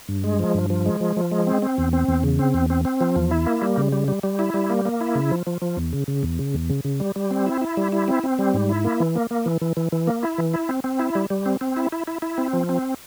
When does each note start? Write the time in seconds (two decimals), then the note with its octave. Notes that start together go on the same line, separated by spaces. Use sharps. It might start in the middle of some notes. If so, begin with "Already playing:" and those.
0.09 G2
0.24 G#3
0.39 F3
0.55 G2
0.70 F3
0.86 G#3
1.00 F3
1.17 F3
1.32 G#3
1.47 C4
1.62 C4
1.78 E2
1.93 C4
2.08 E2
2.23 C#3
2.39 C4
2.54 E2
2.70 C4
2.85 C4
3.01 F3
3.16 E2
3.31 E4
3.47 A#3
3.62 G3
3.77 C#3
3.92 G3
4.08 G3
4.23 G3
4.39 E4
4.54 G3
4.70 A#3
4.85 A#3
5.01 E4
5.15 C#3
5.31 F3
5.47 F3
5.62 F3
5.77 E2
5.93 C#3
6.08 C#3
6.23 E2
6.39 C#3
6.54 E2
6.70 C#3
6.85 C#3
7.00 G3
7.16 G3
7.31 C4
7.46 E4
7.61 E4
7.77 G3
7.92 E4
8.08 C4
8.23 C4
8.39 G3
8.54 G#2
8.69 E4
8.85 A#3
9.00 E3
9.15 A#3
9.31 A#3
9.46 E3
9.61 E3
9.77 E3
9.92 E3
10.07 A#3
10.23 E4
10.38 E3
10.54 E4
10.69 C4
10.84 C4
10.99 E4
11.15 G3
11.30 G3
11.46 C4
11.61 C4
11.76 E4
11.92 E4
12.07 E4
12.22 E4
12.38 C4
12.53 F3
12.69 C4